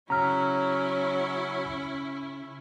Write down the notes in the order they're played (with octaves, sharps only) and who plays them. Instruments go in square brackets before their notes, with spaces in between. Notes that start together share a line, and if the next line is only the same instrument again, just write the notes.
[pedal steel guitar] C#3 E5 [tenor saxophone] F#3 [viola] C#4 E4 [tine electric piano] A#5 F6